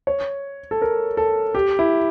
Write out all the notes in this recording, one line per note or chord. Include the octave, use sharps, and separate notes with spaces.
C#5
A4
A#4
A4
G4
E4